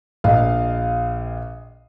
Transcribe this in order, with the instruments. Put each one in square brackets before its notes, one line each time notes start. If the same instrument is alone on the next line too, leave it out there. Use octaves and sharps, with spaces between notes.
[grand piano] A#1 D#5 F5